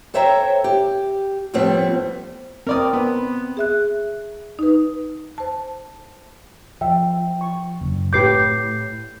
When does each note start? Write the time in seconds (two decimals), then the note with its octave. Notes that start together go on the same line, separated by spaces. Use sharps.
0.14 A4 C5 C#5 E5 G5 A#5
0.64 G4
1.54 A2 F3 G3 A3 B3 C4
2.67 C4 A#4 D5 D#6
2.93 B3
3.57 G#4 E5 F#6
4.59 D#4 B4
5.38 C5 A5
6.81 F3 E5 G5
7.41 C#6
7.81 F#1
8.13 A2 G4 B4 D6 G6 C7